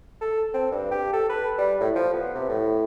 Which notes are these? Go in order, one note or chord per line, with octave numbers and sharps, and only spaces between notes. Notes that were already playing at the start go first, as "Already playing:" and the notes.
A4
C4
G2
G4
A4
B4
G3
A2
F3
B3
C3
A2